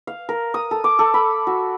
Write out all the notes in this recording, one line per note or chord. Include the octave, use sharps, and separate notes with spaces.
F5
A#4
D#6
A4
D6
A4
B5
F#4